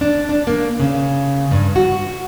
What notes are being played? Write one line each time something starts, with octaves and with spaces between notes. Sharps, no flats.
D4
D4
A#3
C#3
G2
F#4